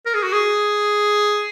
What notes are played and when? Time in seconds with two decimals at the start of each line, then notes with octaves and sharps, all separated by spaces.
0.06 A#4
0.15 G#4
0.23 F#4
0.33 G#4